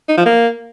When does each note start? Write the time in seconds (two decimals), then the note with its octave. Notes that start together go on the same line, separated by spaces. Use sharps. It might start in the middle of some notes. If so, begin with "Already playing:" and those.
0.09 D#4
0.17 F3
0.26 A#3